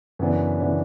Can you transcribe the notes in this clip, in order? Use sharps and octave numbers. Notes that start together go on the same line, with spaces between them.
F#2 C#3 E3 B3 D4
C#3 E3 B3 D4